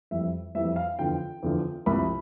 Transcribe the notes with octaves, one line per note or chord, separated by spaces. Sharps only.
F2 E3 G3 E5
F2 E3 G3 E5
F5
E2 D3 F3 G5
E2 D3 F3
C2 C3 F3 B5